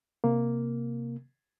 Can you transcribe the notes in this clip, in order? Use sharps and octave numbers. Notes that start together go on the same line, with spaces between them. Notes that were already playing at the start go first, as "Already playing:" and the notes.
C3 A#3